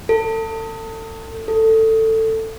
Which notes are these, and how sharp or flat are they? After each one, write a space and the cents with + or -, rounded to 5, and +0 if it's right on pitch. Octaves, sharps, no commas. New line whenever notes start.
A4 +30
A4 +15